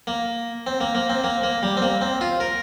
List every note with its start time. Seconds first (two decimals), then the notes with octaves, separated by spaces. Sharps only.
0.07 A#3
0.67 C4
0.80 A#3
0.95 A#3
1.09 C4
1.24 A#3
1.43 A#3
1.63 G3
1.77 C4
1.82 A#3
2.01 C4
2.21 F4
2.40 A#4